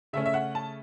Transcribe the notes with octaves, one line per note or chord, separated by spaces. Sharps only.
C#3 A3 C#4 E5
E5
F#5
A5